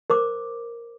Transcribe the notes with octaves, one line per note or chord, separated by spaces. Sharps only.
A#4 C5 D6